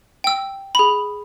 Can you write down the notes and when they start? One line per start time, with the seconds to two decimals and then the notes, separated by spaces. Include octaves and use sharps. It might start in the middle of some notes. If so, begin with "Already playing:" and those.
0.24 G5 E6
0.75 G#4 B5